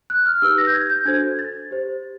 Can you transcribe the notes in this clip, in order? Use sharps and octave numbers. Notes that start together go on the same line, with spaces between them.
F#6
F6
D#4 G4 B4 E6
A#6
G6
G#6
G6
D4 F#4 A4 C5 G#6
A6
G4 C5